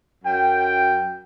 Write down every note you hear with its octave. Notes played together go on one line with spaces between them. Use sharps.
F#2 G5